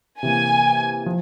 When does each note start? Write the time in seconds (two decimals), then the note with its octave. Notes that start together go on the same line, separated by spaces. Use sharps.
0.23 C3 E3 A#3 G#5
1.06 F3